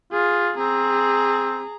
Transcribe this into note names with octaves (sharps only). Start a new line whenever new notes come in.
F4 G#4
C4 G#4 A#5